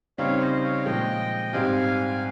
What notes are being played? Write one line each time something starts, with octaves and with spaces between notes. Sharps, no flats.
C#3 G3 C4 D#4 C#5 F5
C5 D#5
D#5
C#5 F5
A#2 F3 G#3 D#5 G5
G#2 G3 C4 G4 F5 G#5